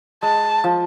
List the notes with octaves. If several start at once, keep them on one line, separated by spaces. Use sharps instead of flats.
G#3 A5
F3